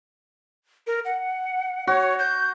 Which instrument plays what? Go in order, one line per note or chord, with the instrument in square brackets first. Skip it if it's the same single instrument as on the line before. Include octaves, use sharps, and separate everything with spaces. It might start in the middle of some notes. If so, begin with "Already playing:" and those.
[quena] A#4
F#5
[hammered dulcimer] F#4 [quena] C#5
[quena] G6